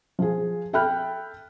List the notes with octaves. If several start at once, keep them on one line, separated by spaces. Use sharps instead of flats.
F3 G#4
A4 E5 G5 B5 F6 F#6